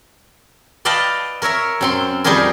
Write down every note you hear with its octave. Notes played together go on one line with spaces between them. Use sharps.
B4 D5 D#5 F5 G5 A5
A#4 C#5 E5 A#5
F#2 C4 C6
F2 G3 D#4 G4 G#4 A#4